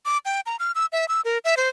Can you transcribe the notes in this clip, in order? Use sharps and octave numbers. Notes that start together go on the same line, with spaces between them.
D6
G5
A#5
F6
E6
E5
E6
A#4
E5
C5